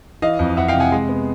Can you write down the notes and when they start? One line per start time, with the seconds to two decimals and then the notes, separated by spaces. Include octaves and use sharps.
0.22 E3 D#5 F5
0.39 F2
0.57 F2 E5 F#5
0.68 F5 G5
0.75 C3
0.80 F#5 G#5
0.92 G#3
1.09 B3